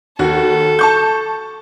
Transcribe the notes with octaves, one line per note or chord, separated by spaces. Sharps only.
D#2 F#4 A4
A5 C#6 G6